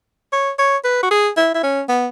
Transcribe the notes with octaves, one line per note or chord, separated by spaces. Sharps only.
C#5
C#5
B4
F#4
G#4
E4
E4
C#4
B3